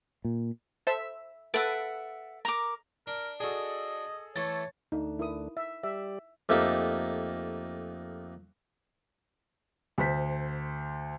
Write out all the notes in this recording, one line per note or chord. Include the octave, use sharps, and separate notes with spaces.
A#2
A4 C5 E5 E6
A4 B4 E5 F#5 A6 D7
A#4 A#5 D6
D4 A#4
D4 F#4 G#4 A4 D#5
E3 A3 A4 C#5 A5 A6
D2 A3 D4 D#4
E4 A#4 D#6
E5
G3 G4 D5 E5
F2 A3 A#3 D#4 G4
D2 C5 B6